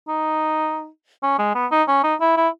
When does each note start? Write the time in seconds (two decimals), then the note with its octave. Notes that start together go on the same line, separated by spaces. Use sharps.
0.08 D#4
1.23 C#4
1.39 G#3
1.55 B3
1.72 D#4
1.88 C#4
2.04 D#4
2.21 E4
2.37 E4